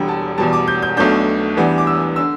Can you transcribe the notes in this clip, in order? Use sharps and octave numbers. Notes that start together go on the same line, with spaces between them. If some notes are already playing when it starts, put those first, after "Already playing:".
Already playing: E1 E2 D3 G3 G5
A5
E2 B2 G3 A5
D6
G6
G6
B1 B2 A3 D4 G6
E2 E3 G3 B3 D4
D6
E6
D3 E6